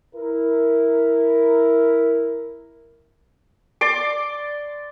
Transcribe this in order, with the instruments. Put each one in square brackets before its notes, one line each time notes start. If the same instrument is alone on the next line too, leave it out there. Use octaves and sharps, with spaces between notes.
[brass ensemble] E4 A#4
[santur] D5 C6 D6